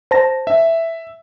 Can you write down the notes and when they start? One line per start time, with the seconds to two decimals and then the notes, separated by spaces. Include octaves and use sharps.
0.11 C5 A5 A#6
0.47 E5